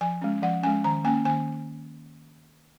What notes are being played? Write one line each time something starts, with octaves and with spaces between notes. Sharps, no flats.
F3 G#5
G#3 C#4
F3 F#5
G#3 C#4 G#5
D#3 A#5
A#3 C#4 G#5
D#3 G#5